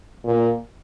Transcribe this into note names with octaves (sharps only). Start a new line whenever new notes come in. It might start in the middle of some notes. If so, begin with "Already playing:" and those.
A#2